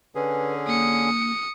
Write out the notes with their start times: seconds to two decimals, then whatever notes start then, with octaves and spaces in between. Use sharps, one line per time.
0.15 D3 C#4 G#4 B4
0.67 A#3 D#6 C#7